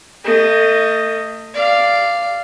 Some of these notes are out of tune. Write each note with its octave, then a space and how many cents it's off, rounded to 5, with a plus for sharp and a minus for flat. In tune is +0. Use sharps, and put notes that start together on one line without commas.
A3 +35 D#5 +0
D5 +0 F5 -10